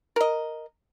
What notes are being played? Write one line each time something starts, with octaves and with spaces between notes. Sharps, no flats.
A#4 D#5